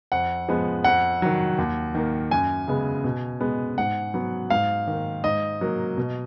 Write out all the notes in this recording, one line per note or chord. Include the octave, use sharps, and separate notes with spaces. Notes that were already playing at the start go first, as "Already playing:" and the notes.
F2 F#5
F3 G#3 B3
F2 F#5
D#3 F#3
D#2
D#3 A#3
F#2 G#5
C#3 G#3 B3
B2
G#3 B3
G#2 F#5
F#3 B3
G#2 F5
D#3 A#3
G#2 D#5
F#3 A#3
B2